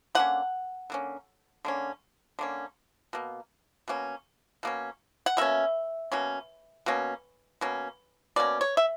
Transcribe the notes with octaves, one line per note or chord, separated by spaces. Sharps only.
D3 A#3 C#4 F#5
D3 A#3 C#4
D3 A#3 C#4
D3 A#3 C#4
B2 A#3
B2 A#3 C#4
B2 A#3 C#4
F#5
B2 A#3 C#4 E5
B2 A#3 C#4
B2 A#3 C#4
B2 A#3 C#4
B2 A#3 C#4 D5
C#5
E5